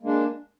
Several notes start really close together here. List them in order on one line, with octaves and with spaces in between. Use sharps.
A#3 G#3 D4